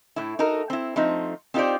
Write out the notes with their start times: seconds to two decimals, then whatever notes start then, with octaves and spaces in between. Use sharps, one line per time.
0.16 A2 E4
0.39 D#4 F#4 A4 A#4
0.70 C4 E4
0.96 F3 A3 C4 D#4
1.54 C4 D#4 F4 G4 C5 D5